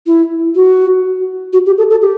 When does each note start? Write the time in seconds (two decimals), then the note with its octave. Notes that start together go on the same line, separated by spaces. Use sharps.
0.06 E4
0.55 F#4
1.53 F#4
1.66 G4
1.77 A4
1.90 A4
2.01 G4